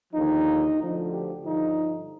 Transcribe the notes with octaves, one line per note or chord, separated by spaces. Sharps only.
D#2 D3 F3 D#4
D2 D3 F3
G4
G2 D3 F3 D#4